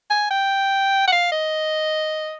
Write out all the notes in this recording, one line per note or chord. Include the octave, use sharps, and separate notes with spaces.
G#5
G5
F#5
F5
D#5